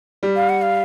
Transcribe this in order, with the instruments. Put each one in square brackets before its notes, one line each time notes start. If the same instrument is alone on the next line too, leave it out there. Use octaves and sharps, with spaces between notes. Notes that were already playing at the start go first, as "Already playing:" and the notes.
[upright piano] G3
[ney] F5
F#5
F5